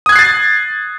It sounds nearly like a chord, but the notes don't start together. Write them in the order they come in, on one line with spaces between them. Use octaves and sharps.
D#6 G#6 F#6 C7 A6